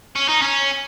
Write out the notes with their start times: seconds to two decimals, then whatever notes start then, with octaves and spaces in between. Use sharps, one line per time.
0.15 C#4
0.28 D#4
0.42 C#4